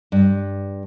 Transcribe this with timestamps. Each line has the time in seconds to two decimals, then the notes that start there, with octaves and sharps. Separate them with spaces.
0.12 G2